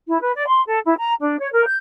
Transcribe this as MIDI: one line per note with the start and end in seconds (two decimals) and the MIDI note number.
0.07 0.20 64
0.21 0.31 71
0.35 0.46 74
0.48 0.61 84
0.67 0.79 69
0.86 0.95 64
0.98 1.14 82
1.20 1.39 62
1.39 1.49 73
1.52 1.64 70
1.66 1.77 91